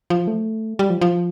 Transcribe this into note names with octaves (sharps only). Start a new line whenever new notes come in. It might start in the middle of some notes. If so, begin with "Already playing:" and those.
F3
A3
G3
F3
F3